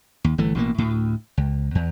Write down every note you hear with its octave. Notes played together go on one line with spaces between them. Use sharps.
D#2
G1 E3 A3
A1 B2 D3 A#3
D2 A2
C#2
E2